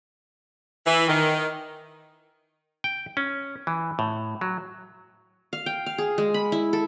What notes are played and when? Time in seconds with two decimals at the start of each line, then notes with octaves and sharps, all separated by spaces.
0.86 E3
1.08 D#3
2.84 G5
3.17 C#4
3.67 E3
3.99 A2
4.41 F#3
5.53 F5
5.66 G5
5.86 F5
5.98 G#4
6.18 G#3
6.34 B5
6.52 E4
6.73 A4